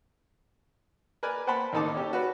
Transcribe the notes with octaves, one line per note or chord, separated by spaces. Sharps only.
A#4 B4 D5 G#5
C5 F#5 G5 A5 B5 C6
A1 D#3 D#4 A4 A5 D6
C#4 G4 A4
F#4 B4 D5